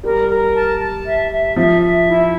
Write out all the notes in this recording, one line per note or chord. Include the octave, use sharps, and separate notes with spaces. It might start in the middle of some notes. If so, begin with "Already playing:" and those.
G3 A#4
A#4
A5
A5
E5
E5
F3 E5
E5
E4